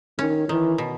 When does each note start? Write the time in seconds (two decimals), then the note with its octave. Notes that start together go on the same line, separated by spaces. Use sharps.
0.19 D#3 C#4
0.48 D#3 E3
0.78 B2